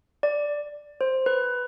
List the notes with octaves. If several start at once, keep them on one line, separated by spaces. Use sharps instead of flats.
D5
C5
B4